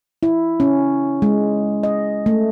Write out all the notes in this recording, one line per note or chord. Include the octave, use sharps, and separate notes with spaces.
E4
C#4
G#3
D#5
A3